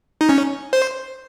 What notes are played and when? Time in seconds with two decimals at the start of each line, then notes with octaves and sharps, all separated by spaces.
0.21 D#4
0.29 C#4
0.73 C5